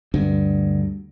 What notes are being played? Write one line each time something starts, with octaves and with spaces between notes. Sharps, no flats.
D2 G2 D3